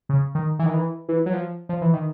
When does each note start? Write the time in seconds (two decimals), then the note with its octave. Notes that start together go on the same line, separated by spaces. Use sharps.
0.09 C#3
0.35 D#3
0.59 E3
0.66 D#3
0.74 E3
1.09 E3
1.26 F#3
1.33 F3
1.69 F3
1.81 E3
1.93 D#3